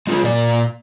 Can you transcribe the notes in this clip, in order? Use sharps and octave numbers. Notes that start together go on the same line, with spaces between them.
G#3 F4 G4 G#4
A#2 A#3 D5